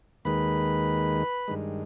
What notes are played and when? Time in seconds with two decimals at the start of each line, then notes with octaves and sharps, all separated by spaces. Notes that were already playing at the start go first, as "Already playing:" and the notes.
0.25 D#2 D#3 G#3 B4 B5
1.48 G2 D#3 G#3